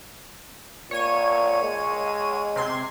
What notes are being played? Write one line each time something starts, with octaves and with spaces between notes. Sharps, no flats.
A#2 C#5 D#7
G#3
C3 C6 G#6